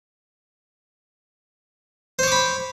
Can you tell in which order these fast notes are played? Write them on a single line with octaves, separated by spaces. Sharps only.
C5 C#5 D6 B5